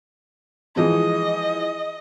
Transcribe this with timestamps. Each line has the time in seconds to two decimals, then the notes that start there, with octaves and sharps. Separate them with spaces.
0.76 E3 F3 G#3 D#5